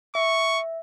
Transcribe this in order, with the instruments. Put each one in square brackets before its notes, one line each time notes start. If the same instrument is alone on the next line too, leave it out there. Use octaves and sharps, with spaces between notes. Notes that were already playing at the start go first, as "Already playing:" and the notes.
[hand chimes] E5 [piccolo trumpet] C#6